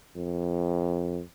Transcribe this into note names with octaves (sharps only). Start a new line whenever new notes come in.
F2